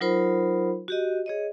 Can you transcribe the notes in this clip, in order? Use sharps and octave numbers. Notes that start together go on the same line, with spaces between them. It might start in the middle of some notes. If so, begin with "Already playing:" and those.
F#3 D#4 F4 A#4 C5 B5
F#4 G4 D#5
G#4 C#5 D#5